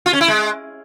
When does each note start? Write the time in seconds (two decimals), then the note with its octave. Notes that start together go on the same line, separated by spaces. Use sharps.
0.06 F4
0.13 C#4
0.21 E4
0.28 G#3